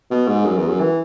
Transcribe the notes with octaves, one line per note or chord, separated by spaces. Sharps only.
B2
G#2
F#2
E2
F#2
E3